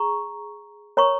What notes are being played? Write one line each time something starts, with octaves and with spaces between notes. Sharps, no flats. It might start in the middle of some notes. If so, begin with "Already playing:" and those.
Already playing: G#4 A#5 C#6
A#4 C#5 A#5 C#6